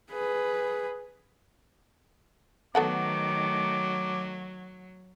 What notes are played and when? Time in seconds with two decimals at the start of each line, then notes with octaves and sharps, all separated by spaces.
0.12 G#4 B4
2.75 D#3 F#3 A3 B3 A4 F#5 D6